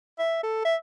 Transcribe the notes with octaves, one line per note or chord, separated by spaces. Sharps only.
E5
A4
E5